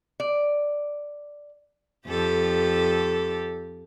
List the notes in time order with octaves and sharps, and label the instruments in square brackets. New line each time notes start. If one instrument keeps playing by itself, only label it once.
[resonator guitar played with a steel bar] D5
[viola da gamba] F2 G4 A4